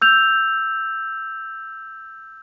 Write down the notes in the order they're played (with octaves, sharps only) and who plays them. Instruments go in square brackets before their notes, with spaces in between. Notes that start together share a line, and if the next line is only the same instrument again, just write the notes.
[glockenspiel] E6 G6 F7